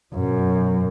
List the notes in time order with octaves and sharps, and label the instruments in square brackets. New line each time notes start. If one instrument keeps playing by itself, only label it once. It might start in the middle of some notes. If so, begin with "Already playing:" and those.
[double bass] F#2 B2